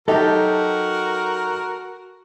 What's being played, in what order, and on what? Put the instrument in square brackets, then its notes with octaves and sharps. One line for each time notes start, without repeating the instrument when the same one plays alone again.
[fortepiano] F#3 D#4 G4 [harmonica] F#4 A#4 [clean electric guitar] A4